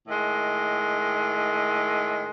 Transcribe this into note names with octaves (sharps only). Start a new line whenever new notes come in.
A2 D#3 G#3